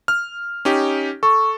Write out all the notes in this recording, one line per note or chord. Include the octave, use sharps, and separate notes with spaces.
F6
C#4 D#4 G4
A4 C#6